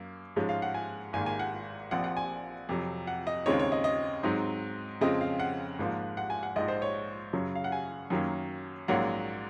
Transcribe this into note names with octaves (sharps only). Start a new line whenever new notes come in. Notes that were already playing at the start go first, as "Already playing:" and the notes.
Already playing: F#2 A#3
G#2 F3 G#3 C#4
F5
F#5
G#5
G#1 G#2 D#3 A#3 G#5
G#5
F#5
A#1 A#2 F3 C4 F#5
F#5
G#5
F2 C3 F#3
F#5
D#5
D#2 C#3 G#3 C4 D#4 C#5
C#5
D#5
D#5
G#2 F#3 C4 D#4
F2 C#3 F3 G#3 C4 D#5
F5
F#5
G#1 G#2 F3 A#3
F#5
G#5
F#5
A#1 G#2 F3 D#5
C5
C#5
F#2 C#3 F#3
F5
F#5
G#5
F#2 D#3 F#3 A#3 C#4
A#1 G#2 F#3 A#3 C#4 F#5